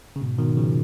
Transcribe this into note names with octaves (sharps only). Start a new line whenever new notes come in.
C#3
G#2 B2
B2 D#3
C#3 F3